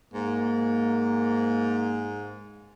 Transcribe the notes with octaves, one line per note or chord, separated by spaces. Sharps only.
G#2 A#3